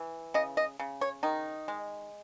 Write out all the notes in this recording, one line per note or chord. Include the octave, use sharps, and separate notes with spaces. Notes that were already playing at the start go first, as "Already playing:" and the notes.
Already playing: E3
C#3 D#5
D#5
C#3
C#5
D#3 D#4
G#3